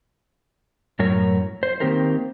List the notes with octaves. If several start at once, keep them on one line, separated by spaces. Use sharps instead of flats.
F#2 A2 F#3 A#4 C#5
C5
D#3 A#3 C4 G4 A#4 C5